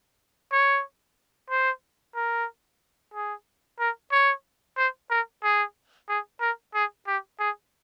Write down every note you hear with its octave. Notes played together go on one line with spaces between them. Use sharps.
C#5
C5
A#4
G#4
A#4
C#5
C5
A#4
G#4
G#4
A#4
G#4
G4
G#4